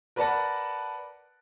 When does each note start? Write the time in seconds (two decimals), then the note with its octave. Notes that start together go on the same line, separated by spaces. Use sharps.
0.16 A#4 B4 D5 F#5 A5 A#6